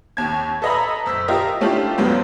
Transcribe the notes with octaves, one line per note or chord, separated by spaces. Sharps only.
D#2 G#6
A4 B4 D#5 E5 A#5 B5
F#1 E6 B6
F4 G4 A#4 D#5 E5
A3 C#4 D4 E4 F4 G4
D2 G#2 F#3 G3 B3